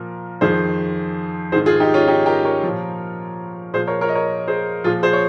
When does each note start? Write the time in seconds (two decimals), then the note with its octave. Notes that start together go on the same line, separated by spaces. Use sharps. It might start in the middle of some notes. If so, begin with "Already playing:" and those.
Already playing: A#2 F3 A#4
0.41 F2 D#3 G#4 C5
1.52 G#2 G#4 C5
1.56 D#3
1.66 F4 G#4
1.80 D#4 G4
1.94 C#4 F4
2.08 D#4 G4
2.26 G4 A#4
2.45 A#4 C#5
2.63 A#2 F3
3.74 A#2 F3 G#4 C5
3.87 A#4 C#5
4.01 A#4 C#5
4.09 D#5
4.15 A#4 C#5
4.48 G#4 C5
4.84 A#2 F3 F4 G#4
5.03 G#4 C5
5.13 C#5